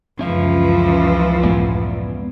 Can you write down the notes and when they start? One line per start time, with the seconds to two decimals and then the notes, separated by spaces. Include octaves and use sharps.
0.19 C#2 F#2 E3 F3 C#4 E5 F5
1.43 A2 G#3 B3 D5 G#5